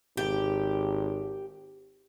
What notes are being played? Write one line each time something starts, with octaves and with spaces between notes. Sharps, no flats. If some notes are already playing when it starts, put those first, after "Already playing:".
G#1 G4